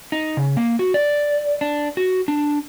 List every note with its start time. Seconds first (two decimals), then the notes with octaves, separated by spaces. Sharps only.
0.12 D#4
0.37 C#3
0.57 A#3
0.79 F#4
0.94 D5
1.61 D4
1.97 F#4
2.28 D4